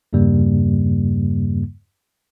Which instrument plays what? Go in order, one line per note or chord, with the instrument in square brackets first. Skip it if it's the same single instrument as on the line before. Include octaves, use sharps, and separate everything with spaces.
[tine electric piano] E2 G2 C#3 G3 A#3